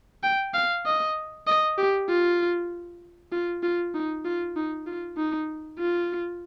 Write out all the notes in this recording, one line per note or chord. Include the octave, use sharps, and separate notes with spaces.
G5
F5
D#5
D#5
G4
F4
F4
F4
D#4
F4
D#4
F4
D#4
F4